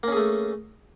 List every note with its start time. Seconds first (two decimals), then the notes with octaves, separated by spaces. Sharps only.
0.03 A#3
0.08 C#4
0.12 G#4
0.17 A3